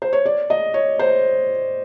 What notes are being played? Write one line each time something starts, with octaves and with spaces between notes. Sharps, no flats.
C5
C#5
D5
D#5
C#5
C5